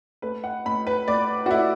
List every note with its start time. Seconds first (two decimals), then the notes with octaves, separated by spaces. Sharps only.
0.22 A3 B4
0.44 F#5
0.65 A2 B5
0.87 B4
1.08 A2 D5
1.46 F#4
1.51 A3 E4